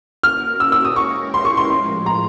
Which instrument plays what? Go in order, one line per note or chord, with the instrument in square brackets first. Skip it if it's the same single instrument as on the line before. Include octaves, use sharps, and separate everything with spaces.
[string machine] A#3 C#4 F#4 A#4 [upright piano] F6
[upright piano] E6
E6
D#6
[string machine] G#3 C#4 E4 G4 A#4 [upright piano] C#6
[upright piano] C6
C#6
C6
[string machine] A2 F3 G#3 [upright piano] C6
[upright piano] A#5